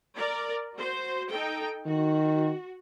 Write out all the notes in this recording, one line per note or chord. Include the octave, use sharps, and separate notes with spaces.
A#4 D5
F#4 C5
D#4 A4 G5
D#3 F#4